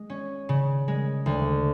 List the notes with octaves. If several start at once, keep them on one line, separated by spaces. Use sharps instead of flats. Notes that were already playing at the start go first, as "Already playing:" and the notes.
Already playing: G#3
C#4
C#3
G#3
D2